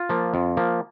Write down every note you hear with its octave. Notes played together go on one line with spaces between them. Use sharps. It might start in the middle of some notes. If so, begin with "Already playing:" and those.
Already playing: F4
F3 A#3
F2
F3 A#3